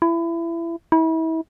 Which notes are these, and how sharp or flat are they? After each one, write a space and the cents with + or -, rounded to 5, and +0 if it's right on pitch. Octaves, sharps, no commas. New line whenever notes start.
E4 +25
E4 -35